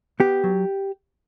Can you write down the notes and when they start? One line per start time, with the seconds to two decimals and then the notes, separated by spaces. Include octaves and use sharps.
0.20 B3 G4
0.44 F#3